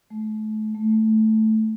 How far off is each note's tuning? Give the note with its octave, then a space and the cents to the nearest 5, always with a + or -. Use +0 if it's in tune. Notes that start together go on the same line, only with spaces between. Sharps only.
A3 -35
A3 -5